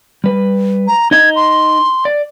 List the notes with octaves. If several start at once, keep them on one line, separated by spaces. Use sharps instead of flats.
G3 B4
A#5
D#4 D#5 A#5 G#6
C6
D5